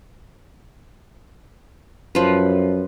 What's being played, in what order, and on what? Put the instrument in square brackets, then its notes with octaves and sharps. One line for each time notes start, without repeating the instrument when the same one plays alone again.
[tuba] F#2 [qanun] F3 B4